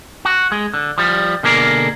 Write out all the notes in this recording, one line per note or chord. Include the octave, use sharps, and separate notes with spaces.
F#4
G#3
D3
F3 G3
B2 D3 A#3 G#4 A#4